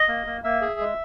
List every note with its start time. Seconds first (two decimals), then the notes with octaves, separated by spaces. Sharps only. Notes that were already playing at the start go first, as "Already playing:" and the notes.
Already playing: D#5
0.08 A#3
0.26 A#3
0.44 A#3 E5
0.61 G#4
0.80 G#3